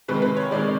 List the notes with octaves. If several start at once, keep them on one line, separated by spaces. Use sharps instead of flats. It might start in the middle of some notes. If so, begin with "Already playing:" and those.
C3 D#3 G#3 B4
B4
C#5
C3 D#3 G#3 D5